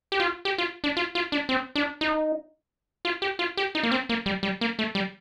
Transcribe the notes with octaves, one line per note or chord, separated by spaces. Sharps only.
G4
F4
G4
F4
D4
F4
F4
D4
C4
D4
D#4
F4
G4
F4
G4
D#4
A#3
C4
A#3
G3
G3
A#3
A3
G3